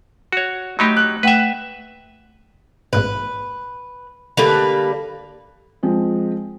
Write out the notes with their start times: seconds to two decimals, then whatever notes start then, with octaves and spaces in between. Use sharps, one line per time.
0.32 F#4 C#5
0.79 F#3 A3 D#4 G4 B5 C6
0.97 F#6
1.23 A3 B4 E5 F#5 G5
2.93 A1 G#2 B2 B4
4.37 D3 G3 A#3 G4 A4 B4
5.83 F3 G#3 C4